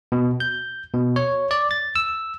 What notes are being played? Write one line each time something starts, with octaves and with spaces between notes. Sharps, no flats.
B2
G6
B2
C#5
D5
A6
E6